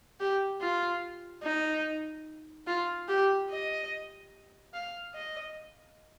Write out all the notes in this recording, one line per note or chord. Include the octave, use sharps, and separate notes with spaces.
G4
F4
D#4
F4
G4
D#5
F5
D#5